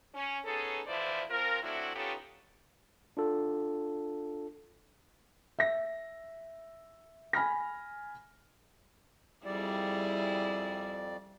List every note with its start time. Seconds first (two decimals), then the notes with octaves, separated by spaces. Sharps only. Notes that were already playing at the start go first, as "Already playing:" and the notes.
0.14 C#4
0.44 B3 C#4 D#4 G#4 A4
0.87 D2 E3 F3 E4 C5 D5
1.30 F3 C4 F4 A#4
1.62 F#3 A3 C4 D4 E4 F#4
1.95 B3 C#4 D#4 F4 G4 A4
3.17 D4 F4 A4
5.59 E5 A#6
7.33 G#5 B5 F6 A#6
9.45 F2 G3 E4 G#4 D5